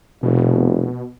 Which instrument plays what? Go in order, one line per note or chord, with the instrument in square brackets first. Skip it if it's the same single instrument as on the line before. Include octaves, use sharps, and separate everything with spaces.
[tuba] F1 [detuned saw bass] B2